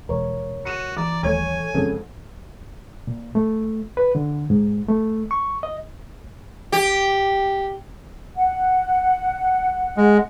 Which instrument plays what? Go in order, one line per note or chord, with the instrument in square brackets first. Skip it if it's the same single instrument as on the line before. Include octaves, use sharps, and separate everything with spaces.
[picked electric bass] E1 [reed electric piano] A#4 C#5
[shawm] F#4 [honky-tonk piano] C#7 D#7 E7
[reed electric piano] E3 [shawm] D5 [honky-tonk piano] A#5 D6
[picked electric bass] D#1 [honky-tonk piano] A3 C#5 G#6 [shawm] G#5
[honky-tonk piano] F2 G#2 [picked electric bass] C#3 [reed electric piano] A4
[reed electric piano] A#2
A3
B4
D3
G#2
A3
C#6
D#5
[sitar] G4
[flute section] F#5
[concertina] G#3